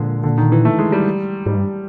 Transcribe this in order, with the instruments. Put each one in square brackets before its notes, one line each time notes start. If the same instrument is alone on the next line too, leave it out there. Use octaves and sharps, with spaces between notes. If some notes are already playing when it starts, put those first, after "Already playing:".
Already playing: [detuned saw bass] A#2 [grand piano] D3 F3 G#3
[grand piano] D3
D#3
E3
A3
G#3
G3
[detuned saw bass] G#2 [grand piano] G3
[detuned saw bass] G2